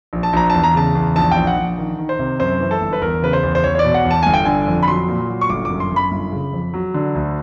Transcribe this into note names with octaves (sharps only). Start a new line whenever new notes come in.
A#1
A5
A#1 A#5
E2 A5
A#5
C#3 A5
E2
A#1 A5
G5
A#1
F#5
A#1
D#3
D#3
C5
C3
F#2 C5
E3
A4
G1
B4
E2 A#4
C#3 B4
C5
E2
C5
E2 C#5
C#5
D5
B2
F#5
E2
A5
G1 G#5
G5
D3 G#5
F2
B5
F#3 C6
A#2
F#3
C#6
G1 D6
D6
F#2
C6
F#2
B5
G1
C#3
F2
F#3
D3
D2